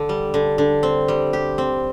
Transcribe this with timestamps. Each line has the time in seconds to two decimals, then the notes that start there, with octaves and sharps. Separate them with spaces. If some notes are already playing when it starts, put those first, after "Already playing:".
Already playing: D3
0.09 G3
0.34 D3
0.58 D3
0.83 C4
1.08 G3
1.33 G4
1.58 C4